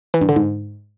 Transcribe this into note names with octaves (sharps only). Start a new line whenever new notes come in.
E3
G2
D3
G#2